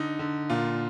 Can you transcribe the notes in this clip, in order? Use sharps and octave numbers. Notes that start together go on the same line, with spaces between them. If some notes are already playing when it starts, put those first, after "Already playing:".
Already playing: D3 D#4
D3
A#2 F4